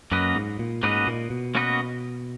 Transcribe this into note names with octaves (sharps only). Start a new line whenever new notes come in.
F#2 A#3 C#4 F#4 B4 D#5
G#2
A#2
G#2 A#3 C#4 F#4 B4 D#5
A#2
B2
A#3 C#4 F#4 B4 D#5